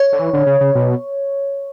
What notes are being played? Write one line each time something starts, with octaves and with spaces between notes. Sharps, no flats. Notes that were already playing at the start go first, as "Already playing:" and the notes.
Already playing: C#5
D3
E3
D3
C#3
C#3
B2